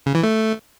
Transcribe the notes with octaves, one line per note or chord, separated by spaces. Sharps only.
C#3
E3
A3